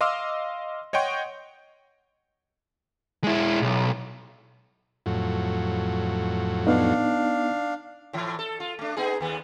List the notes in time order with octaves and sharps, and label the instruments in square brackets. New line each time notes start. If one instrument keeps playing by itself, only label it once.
[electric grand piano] D#5 F5 C6 D6 E6 F6
C#5 D#5 F#5 G5 C6 C#6
[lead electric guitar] G#3 E4
B1
[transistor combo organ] F2 A2 F#3
[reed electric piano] B3 D#4 [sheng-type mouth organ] D4 F5
[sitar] A2 E3
A4
F4
A3 D4
B3 D#4 G#4
D#2 B3